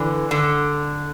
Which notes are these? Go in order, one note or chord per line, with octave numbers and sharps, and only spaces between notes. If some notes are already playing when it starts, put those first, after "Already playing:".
Already playing: D3 E3
D3